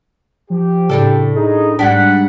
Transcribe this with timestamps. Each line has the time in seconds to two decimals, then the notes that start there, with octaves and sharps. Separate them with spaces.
0.50 F3 G4
0.90 A2 C#3 D4 A4
1.36 D#4 G#4
1.79 G#2 G3 D4 F#5 B6